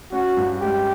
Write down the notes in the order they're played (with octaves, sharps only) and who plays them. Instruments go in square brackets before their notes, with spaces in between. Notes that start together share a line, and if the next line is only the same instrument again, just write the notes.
[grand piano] C#4 [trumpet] F#4
[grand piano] G2
[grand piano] G#3 [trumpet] G4